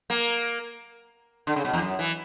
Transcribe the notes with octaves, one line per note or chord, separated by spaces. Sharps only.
A#3
D3
C#3
B2
E2
F#2
E3